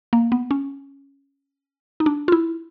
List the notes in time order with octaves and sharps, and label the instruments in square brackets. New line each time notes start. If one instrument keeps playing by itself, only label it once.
[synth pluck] A#3
B3
C#4
D#4
D4
F4
E4